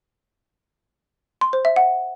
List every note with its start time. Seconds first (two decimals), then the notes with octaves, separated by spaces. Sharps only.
1.41 C6
1.53 C5
1.65 E5
1.76 F#5